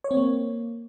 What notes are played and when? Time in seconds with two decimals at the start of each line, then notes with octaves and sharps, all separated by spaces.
0.04 C#5
0.11 C4
0.17 A#3